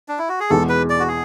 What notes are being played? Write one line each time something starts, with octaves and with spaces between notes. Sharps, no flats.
D4
E4
F#4
G#4
E2 B2 G#3 A4
B4
D5
F#4
G#4